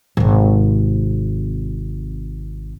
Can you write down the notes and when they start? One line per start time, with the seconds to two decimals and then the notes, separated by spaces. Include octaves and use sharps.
0.17 G#1 C3